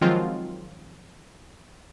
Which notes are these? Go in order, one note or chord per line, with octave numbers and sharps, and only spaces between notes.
D#3 F3 F#3 G#3 C4 F4